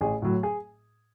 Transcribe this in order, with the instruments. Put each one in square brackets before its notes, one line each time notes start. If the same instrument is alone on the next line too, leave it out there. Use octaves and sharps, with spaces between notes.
[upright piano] A1 G#4
A2 F#3
G#4